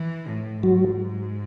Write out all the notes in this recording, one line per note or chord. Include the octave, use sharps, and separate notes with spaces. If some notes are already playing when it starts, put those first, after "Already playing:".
Already playing: E3
A2
G#2 F#3 F#4